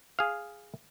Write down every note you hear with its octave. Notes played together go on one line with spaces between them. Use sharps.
G#4 F5